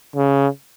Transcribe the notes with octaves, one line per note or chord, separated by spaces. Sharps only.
C#3